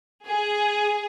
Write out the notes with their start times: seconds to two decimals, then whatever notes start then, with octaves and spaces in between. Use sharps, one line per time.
0.26 G#4